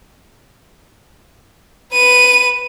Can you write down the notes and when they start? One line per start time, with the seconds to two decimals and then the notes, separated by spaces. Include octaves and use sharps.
1.94 B4 D#7